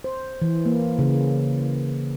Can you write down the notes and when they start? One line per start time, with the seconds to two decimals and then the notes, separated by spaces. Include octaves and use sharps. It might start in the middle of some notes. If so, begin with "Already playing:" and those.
0.04 C5
0.42 E3
0.66 A#3
0.99 C#3